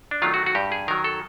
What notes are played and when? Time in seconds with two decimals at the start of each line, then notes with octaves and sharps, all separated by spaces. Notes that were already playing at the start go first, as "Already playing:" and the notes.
0.11 D4
0.22 D#3 F#3 A3 F4
0.34 F#4
0.46 F#4
0.55 G2 G4
0.72 G#4
0.88 D#3 F#3 A#4
1.04 A4